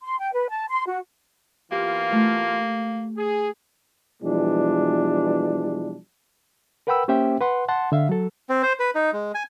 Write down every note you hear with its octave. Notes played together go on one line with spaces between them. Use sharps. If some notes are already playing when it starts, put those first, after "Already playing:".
C6
G5
B4
A5
C6
F#4
E3 A#3 B3 F4 G4
A3
G#4
B2 E3 F3 G3 G#3 D4
A#4 B4 F#5 G5 B5 E6
A#3 C#4 G4 C5 E5 G5
B4 F#5 C6
F#5 A5 C6
D3 E5 F5
F#3 A4
C4
C5
B4
D#4
G#3
G#5